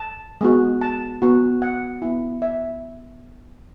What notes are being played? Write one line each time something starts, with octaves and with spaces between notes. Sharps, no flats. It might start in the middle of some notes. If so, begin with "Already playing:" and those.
Already playing: A5
G#3 B3 F#4
A5
B3 F#4
F#5
B3 E4
E5